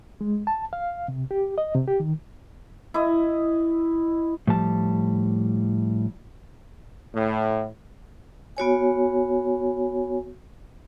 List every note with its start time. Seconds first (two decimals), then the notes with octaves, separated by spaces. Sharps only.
0.21 G#3
0.47 A5
0.73 F5
1.08 C3
1.31 G4
1.58 D#5
1.75 C3
1.88 G4
2.00 D#3
2.94 E4 D#5
4.47 A2 F3 G3 A5
7.14 A2
8.57 B3 F#4 C#5 G#5